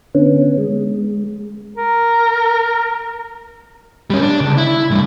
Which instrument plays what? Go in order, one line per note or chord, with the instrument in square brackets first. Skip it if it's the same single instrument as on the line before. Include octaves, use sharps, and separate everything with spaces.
[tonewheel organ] D3 B3 C#4
G#3
[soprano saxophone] A#4
[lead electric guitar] G3 C#4
D4
C#2
E4
C2 G2